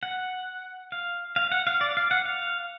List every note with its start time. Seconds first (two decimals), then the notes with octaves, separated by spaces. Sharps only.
0.03 F#5
0.92 F5
1.36 F5
1.52 F#5
1.67 F5
1.81 D5
1.97 F5
2.11 F#5
2.25 F5